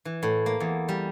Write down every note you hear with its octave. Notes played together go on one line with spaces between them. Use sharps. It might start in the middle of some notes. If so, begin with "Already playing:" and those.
E3
A2
A#3
E2
G3